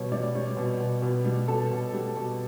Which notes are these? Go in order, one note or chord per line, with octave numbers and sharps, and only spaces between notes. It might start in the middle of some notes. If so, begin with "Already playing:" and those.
Already playing: B2 G3 C#5
G3 D5
G3 C#5
B2
B2
B2
G3
B2 A4
B2
G3 G4
B2